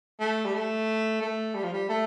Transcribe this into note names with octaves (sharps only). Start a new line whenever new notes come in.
A3
G3
A3
A3
G3
F3
G3
A3